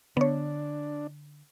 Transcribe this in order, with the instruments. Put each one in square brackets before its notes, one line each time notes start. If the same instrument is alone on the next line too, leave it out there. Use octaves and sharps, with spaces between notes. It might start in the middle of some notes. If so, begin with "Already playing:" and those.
[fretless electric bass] D3 [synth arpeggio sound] B3 C#5 [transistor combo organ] D4